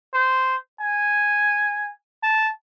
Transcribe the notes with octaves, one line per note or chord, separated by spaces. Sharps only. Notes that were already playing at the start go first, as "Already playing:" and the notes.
C5
G#5
A5